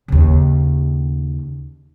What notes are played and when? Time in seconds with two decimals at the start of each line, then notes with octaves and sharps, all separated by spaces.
0.08 D#2 C#3